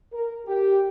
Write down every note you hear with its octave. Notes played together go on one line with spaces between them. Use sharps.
A#4
G4